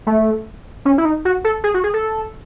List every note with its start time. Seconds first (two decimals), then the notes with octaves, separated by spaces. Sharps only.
0.07 A3
0.85 C#4
0.98 E4
1.05 D#4
1.25 F#4
1.44 A4
1.64 G#4
1.74 F#4
1.84 G#4
1.94 A4